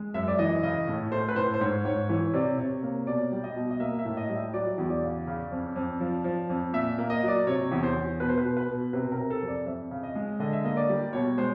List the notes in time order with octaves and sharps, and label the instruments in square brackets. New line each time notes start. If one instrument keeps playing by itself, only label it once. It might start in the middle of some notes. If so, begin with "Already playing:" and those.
Already playing: [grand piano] G#3
F#2 E5
D5
E3 D#5
C#3 D#5
A2
A3 C5
B4
A2 C5
C5
G#2 C#5
G#2 C#5
E3 C#5
C3 D5
C3 C#5
A#3 C#5
B2 D5
G3
D#5
B2
D#5
A#3 E5
E5
A2
D#5
G3
E5
F#3 D5
E2
D5
C#3
C#3
F2
F2
F3
F3
F2
A#2 E5
A#3
D#5
F#3 D5
C3 C#5
E2
C5
E2
B2 B4
C5
B4
B2
B4
B2
C3 B4
A#4
C3
A4
F2
D5
F2 E5
C#3
D#5
G#3
D3 D#5
E5
A#3 D#5
D5
G3
B2 C#5
G#3 C5